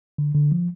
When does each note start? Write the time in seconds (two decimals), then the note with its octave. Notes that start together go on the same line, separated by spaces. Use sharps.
0.18 D3
0.35 D3
0.52 F3